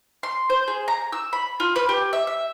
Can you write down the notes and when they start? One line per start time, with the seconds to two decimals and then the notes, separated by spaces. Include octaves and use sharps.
0.23 C6
0.50 C5
0.68 G#4
0.88 A#5
1.13 E6
1.33 B5
1.60 F4
1.76 B4
1.89 G4
2.13 E5
2.27 E5